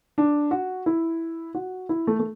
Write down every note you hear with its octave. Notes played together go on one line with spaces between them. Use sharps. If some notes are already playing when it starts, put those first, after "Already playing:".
D4
F#4
E4
F#4
E4
A3
A3